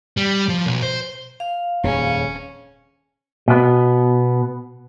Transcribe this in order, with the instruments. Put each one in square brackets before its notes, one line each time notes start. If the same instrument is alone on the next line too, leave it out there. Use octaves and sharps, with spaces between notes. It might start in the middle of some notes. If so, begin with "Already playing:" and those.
[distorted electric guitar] G3
F3
B1
C5
[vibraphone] F5
[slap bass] D#1 F2 G#2 [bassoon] C#3 [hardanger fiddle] C#4
[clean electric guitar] B2 B3